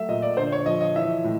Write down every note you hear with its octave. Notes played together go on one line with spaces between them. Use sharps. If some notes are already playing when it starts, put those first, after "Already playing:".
Already playing: F#3 A3 E5
A#2 D#5
D5
D3 C5
C#5
F3 D#5
D#5
E3 E5
A2